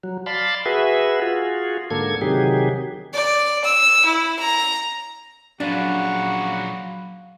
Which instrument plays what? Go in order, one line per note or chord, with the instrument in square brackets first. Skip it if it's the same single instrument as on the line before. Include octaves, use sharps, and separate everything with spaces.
[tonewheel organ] F#3
D5 F5 A5 B5 C6
F#4 G#4 B4 E5
F4 F#4 G#4
G#2 D3 A#3 A4 G#6
C3 D#3 F#3 G4 G#4
[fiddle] D5
E6
E4
A#5
[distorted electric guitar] F2 A#2 [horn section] C#3 F#4 [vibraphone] F#3 F5 B5 [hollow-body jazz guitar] D4